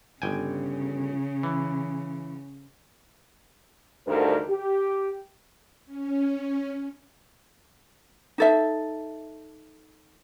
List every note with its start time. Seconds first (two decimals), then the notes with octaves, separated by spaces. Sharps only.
0.22 G1 C#3 G5 G#5
1.43 E3
4.07 D2 G2 D3 D#3 A#4 C5
4.49 G4
5.86 C#4
8.38 D#4 A4 E5